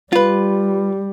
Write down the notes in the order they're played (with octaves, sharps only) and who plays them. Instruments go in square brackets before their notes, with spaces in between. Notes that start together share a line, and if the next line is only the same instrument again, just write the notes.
[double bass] G3 [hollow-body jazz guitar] F4 B4